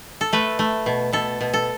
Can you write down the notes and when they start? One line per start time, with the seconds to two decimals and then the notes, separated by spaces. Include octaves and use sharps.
0.21 A4
0.33 A3 B4
0.59 A3
0.86 B2
1.13 B2 A4
1.41 B2
1.53 A4